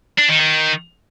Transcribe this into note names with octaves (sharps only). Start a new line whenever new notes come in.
D4
D#3
D#3